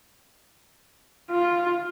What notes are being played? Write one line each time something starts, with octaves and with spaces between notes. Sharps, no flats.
F4